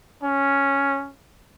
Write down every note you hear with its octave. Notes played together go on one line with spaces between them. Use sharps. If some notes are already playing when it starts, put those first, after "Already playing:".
C#4